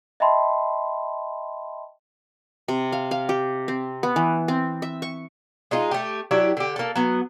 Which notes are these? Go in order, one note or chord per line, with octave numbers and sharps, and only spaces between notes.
D#5 E5 G5 A5 B5 C6
C3
F5
F5
G4
C4
B3
E3
C4
E5
C#6
G#3 D#4 F4
A3 G4
F#3 D4 E4 G4
D3 G4
A#3 A4
F#3 B3